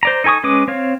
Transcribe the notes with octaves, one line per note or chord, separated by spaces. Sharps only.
C5 D5 A#5
D#4 A4 G#5 C#6 D#6
G#3 C#4 B4 D6 D#6
C4 C#5 F5